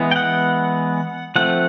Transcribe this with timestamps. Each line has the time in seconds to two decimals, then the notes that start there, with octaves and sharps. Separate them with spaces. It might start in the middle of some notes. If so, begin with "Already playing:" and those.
Already playing: E3 G#3 B3
0.11 G5
0.16 F#5
1.36 F3 A3 C4 F#5